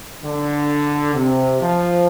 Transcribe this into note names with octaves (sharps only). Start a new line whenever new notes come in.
D3
C3
F3